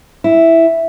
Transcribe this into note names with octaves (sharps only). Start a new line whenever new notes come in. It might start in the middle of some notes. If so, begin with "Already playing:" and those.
E4